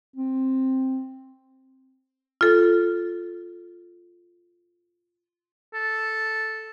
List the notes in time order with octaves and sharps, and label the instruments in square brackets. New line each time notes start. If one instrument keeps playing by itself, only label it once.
[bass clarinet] C4
[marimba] F4 A4
[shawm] A4